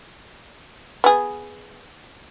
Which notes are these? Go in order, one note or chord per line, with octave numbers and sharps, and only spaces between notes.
B3 G#4